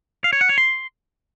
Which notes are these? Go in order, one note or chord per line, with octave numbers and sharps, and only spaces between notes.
F5
C#5
F#5
C#5
C6